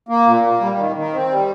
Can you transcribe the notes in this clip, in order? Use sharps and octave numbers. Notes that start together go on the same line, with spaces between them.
A#3
A#2
A#3
G3
D#3
D#3
C4
G3